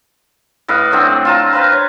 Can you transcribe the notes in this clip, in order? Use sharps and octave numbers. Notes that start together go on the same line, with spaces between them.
A2 B4 D#5 F5
F#3 A3 C4 D4
F4 A5 A#5
B4 C5 F5 A#5
C#5